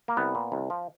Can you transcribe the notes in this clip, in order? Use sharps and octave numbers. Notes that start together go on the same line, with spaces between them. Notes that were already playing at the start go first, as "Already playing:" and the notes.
A#3
C2 B3
A#2
C2
F3